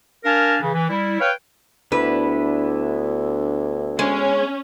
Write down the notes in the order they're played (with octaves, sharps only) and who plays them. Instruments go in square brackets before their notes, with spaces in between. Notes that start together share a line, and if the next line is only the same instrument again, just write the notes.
[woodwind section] D4 A#4 F5 G#5 A5
C#3 E3
E3
G3 E4
B4 C#5 F5 G5
[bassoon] D2 [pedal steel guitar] B3 D4 E4 [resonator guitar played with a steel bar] B4
[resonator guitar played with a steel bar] G#3 [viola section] C#4